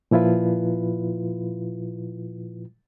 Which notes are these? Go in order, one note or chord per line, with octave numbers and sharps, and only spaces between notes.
A#2 F3 E4 F4 B4